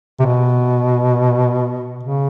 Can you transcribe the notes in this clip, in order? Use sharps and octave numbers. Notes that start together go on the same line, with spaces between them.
C3
B2
C#3